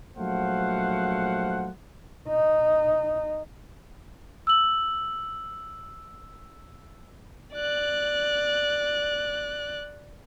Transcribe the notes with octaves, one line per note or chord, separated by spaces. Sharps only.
A#1 F#3 A3 C5 F5 F#5
D#4
E6 F#7
D5 F#6